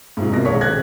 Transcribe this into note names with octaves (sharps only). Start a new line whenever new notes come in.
G#2 C3 F#3 F4
C2 B2 A#3 A#6
D#1 A#1 G#3 C#5 C#6 B6
D#1 C4 F#6 G#6 A#6